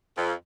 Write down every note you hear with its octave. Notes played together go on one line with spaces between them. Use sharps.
F2